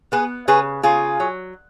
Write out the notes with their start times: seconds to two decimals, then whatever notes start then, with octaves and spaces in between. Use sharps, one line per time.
0.12 B3 G#4 B4
0.48 C#3 G#4 B4
0.83 C#3 F4 G#4
1.20 F#3